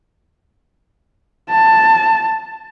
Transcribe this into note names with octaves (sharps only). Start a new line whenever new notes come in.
A5